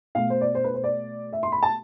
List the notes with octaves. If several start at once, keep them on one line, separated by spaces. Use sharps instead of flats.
B2 A3 F5
C5
D5
C5
B4
C5
D5
E5
C6
B5
A5